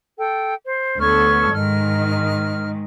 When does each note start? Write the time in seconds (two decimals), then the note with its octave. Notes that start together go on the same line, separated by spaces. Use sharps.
0.18 A4 G5
0.66 C5
1.00 D2 B3 A4 C#5 C#6 F6
1.52 G#2 D#3 F6